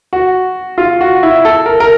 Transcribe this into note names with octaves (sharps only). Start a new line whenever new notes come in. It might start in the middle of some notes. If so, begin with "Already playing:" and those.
F#4
F4
F#4
E4
A4
A#4
A#4